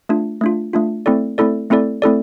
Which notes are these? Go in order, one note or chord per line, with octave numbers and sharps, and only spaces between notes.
A3 D4 F4
A3 D4 F4
A3 D4 F4
A3 C4 E4 A4 D5
A3 C4 E4 A4 D5
A3 C4 E4 A4 D5
A3 C4 E4 A4 D5